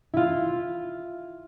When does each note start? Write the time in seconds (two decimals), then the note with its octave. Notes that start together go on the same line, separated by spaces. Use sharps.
0.14 E4 F4